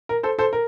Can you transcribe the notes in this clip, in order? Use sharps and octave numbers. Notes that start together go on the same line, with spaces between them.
A#4
A4 C5
A4 C5
A#4